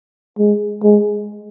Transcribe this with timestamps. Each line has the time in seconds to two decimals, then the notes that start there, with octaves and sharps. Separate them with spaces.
0.39 G#3
0.83 G#3